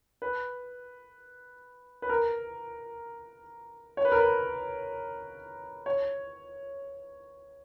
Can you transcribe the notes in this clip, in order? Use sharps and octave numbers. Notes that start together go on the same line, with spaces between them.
B4
B4
A#4
C#5
B4
A#4
B4
C#5